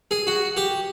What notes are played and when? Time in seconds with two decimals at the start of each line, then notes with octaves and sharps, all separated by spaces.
0.11 G#4
0.27 F#4
0.57 G4